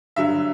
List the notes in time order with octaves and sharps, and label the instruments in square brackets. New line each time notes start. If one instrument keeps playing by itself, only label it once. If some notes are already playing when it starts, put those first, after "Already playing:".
[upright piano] G2 D3 F#3 E5